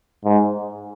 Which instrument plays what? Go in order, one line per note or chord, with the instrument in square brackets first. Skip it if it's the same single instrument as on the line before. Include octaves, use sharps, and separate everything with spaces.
[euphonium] G#2